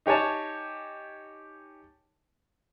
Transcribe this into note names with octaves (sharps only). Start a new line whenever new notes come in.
D#4 G4 C#5 G#5 A5